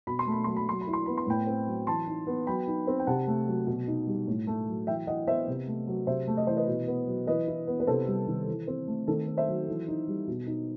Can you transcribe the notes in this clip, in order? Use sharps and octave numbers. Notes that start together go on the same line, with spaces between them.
B2 B5
C6
A3 B5
F#3 C6
B5
F#3 C6
B5
E4
C6
B3 B5
C6
A2 G5 B5
C4
F#3
E3 A5 C6
D#4
B3
F#3 G5 B5
D#4
C4
G5
C3 F#5 A5
A3
F#3
B2
D#4
G3
A2
A3
F#3
E3 E5 G5
E4 D#5 F#5
B3 C5 E5
C3
A3
F#3
C3 C5 E5
A3
D#5
E3 C5
B4 D#5
B2
B3
F#3
E3 B4 D#5
E4
B3
B4
C3 A4 C5
G3
D#3
E3
C4
A3
D#3 A4
C4
C5 E5
F#3
E3
D#4
G3
B2
D#4